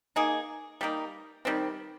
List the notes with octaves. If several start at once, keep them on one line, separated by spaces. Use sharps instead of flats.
A#3 D#4 G#4
G3 A#3 D#4
D#3 G3 C4